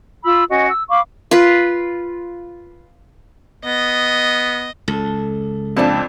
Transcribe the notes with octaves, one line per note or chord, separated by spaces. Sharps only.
F4 B5 E6
C#4 F#4 D#5
E6
F5 B5 C#6 D6
F4 B4
B3 D#5
C#2 A4
F2 A#3 C4 D4 A5